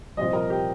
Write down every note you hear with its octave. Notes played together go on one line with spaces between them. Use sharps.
C2 A#2 F3 D#5
A#4
G4